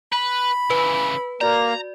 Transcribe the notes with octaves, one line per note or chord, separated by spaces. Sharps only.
B4 B5
C#3 E3 B4
A#3 F#4 D5 A#5